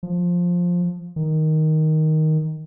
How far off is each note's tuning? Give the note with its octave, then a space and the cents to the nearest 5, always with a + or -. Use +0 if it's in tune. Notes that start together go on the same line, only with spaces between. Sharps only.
F3 +10
D#3 +5